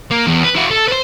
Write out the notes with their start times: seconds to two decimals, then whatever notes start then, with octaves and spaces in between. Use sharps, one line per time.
0.11 A#3
0.27 E2
0.44 B4
0.56 E4 F#4
0.71 A4
0.88 B4 C5